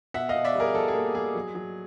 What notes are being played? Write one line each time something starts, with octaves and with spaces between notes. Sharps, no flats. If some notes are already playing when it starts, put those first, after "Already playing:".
B2 E5 F#5
D#5 F5
B2
D5 E5
G3 G#4 A#4
G3 A4
G#4
A#3
G3 G#4
F#3
F#3